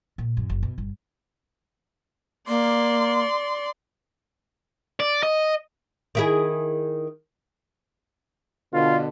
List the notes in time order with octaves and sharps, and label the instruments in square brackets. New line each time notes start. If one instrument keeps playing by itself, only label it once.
[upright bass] A#2
F#2
F#1
B2
G1
[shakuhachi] A#3 [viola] D5 C6
[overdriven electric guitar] D5
D#5
[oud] D#3 E4 G#4
[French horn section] B2 D3 [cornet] F4